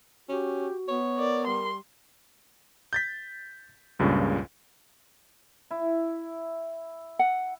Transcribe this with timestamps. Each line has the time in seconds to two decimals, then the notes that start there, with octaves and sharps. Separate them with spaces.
0.29 C#4 F#4 G4
0.88 B3 C#5
1.18 A#4 D5
1.47 G3 C6
2.93 G6 A6 B6
3.99 C#2 G2 A#2 C#3
5.71 E4
7.19 F#5